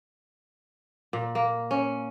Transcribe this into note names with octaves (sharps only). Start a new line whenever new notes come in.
A#2
A#3
C#4